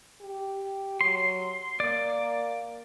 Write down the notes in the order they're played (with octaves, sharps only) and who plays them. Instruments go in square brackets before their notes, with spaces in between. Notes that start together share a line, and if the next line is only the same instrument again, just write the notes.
[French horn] G4
[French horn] F#3 [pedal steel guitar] C6
[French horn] A#3 [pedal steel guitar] D5